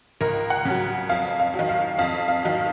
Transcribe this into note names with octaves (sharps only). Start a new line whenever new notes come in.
C#2 A#4
F#5
C#3 F#3
F2 F5
F5
D#3 F#3
F5
F2 F5
F5
D#3 F#3